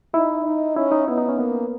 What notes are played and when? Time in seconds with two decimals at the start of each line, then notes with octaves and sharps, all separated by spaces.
0.14 D#4 E4
0.45 D#4
0.76 C#4 E4
0.92 D#4
1.08 B3 E4
1.18 D#4
1.29 C#4
1.39 A#3 B3